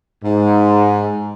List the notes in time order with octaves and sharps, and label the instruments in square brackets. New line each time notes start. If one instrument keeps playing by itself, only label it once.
[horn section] G#2